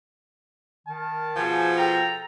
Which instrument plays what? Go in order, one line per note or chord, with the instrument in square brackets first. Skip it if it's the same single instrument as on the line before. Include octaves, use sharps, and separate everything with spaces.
[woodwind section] D#3 [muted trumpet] A5
[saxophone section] B2 F3 [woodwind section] G#4 F#5 G#5
[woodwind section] G#4 A4 A#5 [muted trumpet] G5